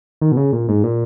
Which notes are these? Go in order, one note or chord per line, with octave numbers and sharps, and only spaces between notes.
D#3
B2
C#3
A#2
G#2
A#2